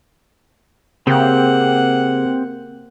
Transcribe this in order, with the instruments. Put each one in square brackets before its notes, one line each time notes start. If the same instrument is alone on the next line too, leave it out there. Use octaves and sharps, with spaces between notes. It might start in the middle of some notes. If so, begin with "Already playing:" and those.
[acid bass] C#3 [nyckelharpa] A#3 F#5 [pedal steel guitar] C4 G4 G5